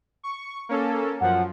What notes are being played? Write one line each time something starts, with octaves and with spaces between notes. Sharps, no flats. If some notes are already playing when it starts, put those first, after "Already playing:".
C#6
A#3 C#4 A4
F#2 F3 F#5